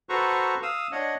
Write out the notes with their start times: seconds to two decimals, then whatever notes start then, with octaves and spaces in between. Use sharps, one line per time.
0.09 F#4 A4 B4 C5 A#5 C#6
0.62 F5 D#6 E6
0.92 D4 C#5 D#5 F#5